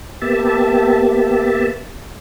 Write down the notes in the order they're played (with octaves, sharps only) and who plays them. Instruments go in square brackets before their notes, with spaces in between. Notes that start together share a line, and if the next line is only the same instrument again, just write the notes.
[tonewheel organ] A#3 B3 G4 E5 A5